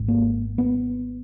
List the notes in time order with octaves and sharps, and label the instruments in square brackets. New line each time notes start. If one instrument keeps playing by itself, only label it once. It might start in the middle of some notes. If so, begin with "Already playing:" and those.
Already playing: [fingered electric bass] G#1 G#2
A#3
B3